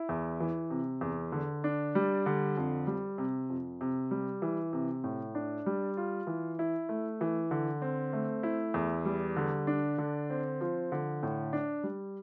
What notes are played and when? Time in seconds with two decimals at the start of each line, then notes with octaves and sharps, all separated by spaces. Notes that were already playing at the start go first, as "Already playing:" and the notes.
Already playing: E4
0.09 E2
0.40 E3
0.70 C3
1.01 E2
1.32 D3
1.64 D4
1.95 G3
2.26 D3
2.57 F2
2.87 G3
3.18 C3
3.50 F2
3.81 C3
4.11 G3
4.42 E3
4.73 C3
5.04 A2
5.35 D4
5.66 G3
5.97 F4
6.27 E3
6.59 E4
6.89 A3
7.21 E3
7.51 D3
7.82 C4
8.13 A3
8.43 E4
8.74 E2
9.05 G3
9.36 D3
9.67 D4
9.98 D3
10.30 C4
10.61 F3
10.92 D3
11.23 A2
11.53 D4
11.83 G3